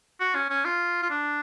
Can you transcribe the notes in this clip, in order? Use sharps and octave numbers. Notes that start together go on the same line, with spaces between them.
F#4
C#4
C#4
F4
F4
D4